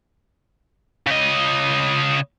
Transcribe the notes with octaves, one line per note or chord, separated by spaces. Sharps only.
C#3 D#5